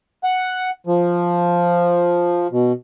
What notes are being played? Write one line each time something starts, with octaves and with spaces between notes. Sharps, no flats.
F#5
F3
B2